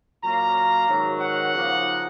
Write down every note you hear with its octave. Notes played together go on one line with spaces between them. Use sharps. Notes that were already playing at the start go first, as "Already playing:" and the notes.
A#2 F#3 A#3 C#4 A#5
G#2 D#3 F#3 C#4
F#5
C#3 F3 A#3 D#4